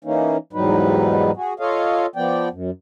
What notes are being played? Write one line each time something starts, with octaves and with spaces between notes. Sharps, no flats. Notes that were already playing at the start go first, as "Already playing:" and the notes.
E3 A#3 C#4 D#4
E2 G#2 F#3 G3 D#4 B4
F#4 G#4
F4 A4 C#5 D#5 F5
F3 B3 D5 G5
F#2